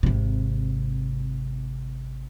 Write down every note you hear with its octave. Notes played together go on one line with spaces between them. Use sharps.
G#1 C3